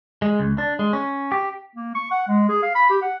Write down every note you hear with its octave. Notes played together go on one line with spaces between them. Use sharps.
G#3
C#2
D4
G#3
C#4
G4
A#3
C#6
F#5
G#3
G#4
F5
B5
G4
F#5